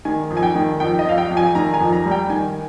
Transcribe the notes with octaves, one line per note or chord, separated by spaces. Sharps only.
D#3 G#5
F2
G#5
G5
D#3
F2 G5
D#5
F2 F5
G5
F2
G#5
D#3 A#5
G#5
F2
A#5
G3
G5
D#3 G#5